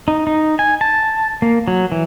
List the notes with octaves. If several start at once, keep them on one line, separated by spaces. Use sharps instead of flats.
D#4
D#4
G#5
A5
A#3
F#3
E3